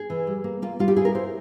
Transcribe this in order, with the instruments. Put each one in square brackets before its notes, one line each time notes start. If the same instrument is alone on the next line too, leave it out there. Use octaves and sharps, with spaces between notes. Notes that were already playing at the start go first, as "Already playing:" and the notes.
Already playing: [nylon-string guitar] G#4
E3
G3
A#3
A#3 F4
G3 F4
G4
E4 G#4
A#4
E4 C5